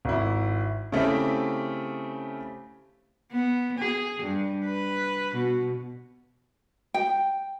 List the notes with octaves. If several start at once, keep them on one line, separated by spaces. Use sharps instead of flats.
G#1 E4
C#3 A3 C4 E4 G4
B3
G#4
G2
B4
B2
G5